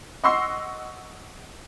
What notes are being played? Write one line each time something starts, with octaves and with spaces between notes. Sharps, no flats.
D#5 F#5 C6 C#6 E6 C7